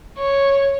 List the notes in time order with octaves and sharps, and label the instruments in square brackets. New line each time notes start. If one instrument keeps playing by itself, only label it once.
[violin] C#5